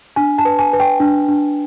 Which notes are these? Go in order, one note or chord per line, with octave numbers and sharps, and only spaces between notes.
D4 G#5
A5
B4
G#5
B4
G5
D4
D4